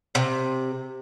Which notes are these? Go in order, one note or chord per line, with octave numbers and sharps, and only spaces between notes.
C3